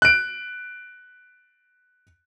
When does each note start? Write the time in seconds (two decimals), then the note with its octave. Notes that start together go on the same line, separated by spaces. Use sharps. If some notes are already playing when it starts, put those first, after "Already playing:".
0.02 F#6 D7